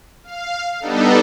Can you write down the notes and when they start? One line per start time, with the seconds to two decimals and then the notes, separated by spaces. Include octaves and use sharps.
0.24 F5
0.80 G3 B3 D4 D#4 A4